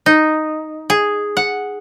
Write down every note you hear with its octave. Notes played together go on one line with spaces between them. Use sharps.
D#4
G#4
F#5